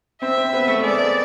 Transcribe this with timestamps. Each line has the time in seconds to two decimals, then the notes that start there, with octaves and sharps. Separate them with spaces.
0.22 C4 C5 E5
0.37 C4 C5
0.53 B3 B4
0.67 A3 A4
0.79 A4
0.82 G#3 G#4 D5